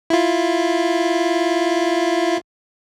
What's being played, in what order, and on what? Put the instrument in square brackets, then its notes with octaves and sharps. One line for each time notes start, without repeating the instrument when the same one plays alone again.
[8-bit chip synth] E4 F4